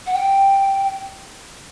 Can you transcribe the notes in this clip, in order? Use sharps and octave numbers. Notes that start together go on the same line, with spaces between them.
F#5
G5